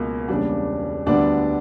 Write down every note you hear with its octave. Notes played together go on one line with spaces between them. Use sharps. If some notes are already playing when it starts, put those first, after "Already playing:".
Already playing: C#2 B2 A#3
E1 E2 C#3 G3 A#3 D4 D5
D2 D3 G3 B3 D4 D5